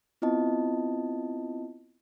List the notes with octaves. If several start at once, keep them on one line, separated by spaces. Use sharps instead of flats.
B3 C4 E4 F4 D#5 A5